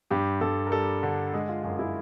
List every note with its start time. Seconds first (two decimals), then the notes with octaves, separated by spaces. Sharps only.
0.10 G2 G4
0.41 G2 A4
0.67 A#4
0.72 G3 A4
1.03 D3
1.33 G#3 G#4
1.49 F4
1.64 F#2 F4
1.79 E4